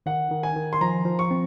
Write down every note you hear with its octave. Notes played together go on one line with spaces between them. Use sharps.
D#3 F#5
D#3
G#5
D#3
C6
F3 A#5
F3
C#6
C4